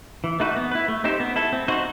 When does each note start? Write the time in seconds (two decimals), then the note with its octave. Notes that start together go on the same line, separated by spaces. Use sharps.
0.24 E3
0.40 A3 D#4 F#4 B4
0.56 B3
0.71 E4 B4
0.88 A3
1.04 C4 D#4 G4 C5
1.20 B3
1.36 E4 A4
1.53 C4
1.68 D#4 F#4 C5